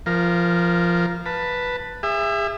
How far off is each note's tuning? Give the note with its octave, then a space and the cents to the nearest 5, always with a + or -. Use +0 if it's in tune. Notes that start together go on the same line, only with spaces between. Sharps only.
F3 -15 A#4 +5
B4 +0 A5 +10
G#4 -35 E5 +20